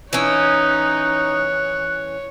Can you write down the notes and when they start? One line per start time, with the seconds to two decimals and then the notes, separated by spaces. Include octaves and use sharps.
0.13 E3 C#4 D#4 C#5 F#6